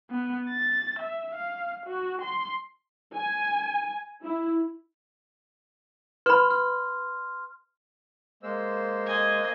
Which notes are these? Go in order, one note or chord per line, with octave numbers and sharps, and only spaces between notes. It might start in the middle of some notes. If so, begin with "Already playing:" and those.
B3
A6
E5
F5
F#4
C6
G#5
E4
B4 B5 C6 F6
F6
G#3 A#3 C5 E6
D#5 G#5